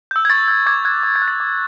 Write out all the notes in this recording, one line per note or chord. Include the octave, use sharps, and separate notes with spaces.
E6 G6
G#6
C#6 A6
E6 G6 A6
D6 G#6
F#6 G#6
D6
G#6
F#6
A6
D6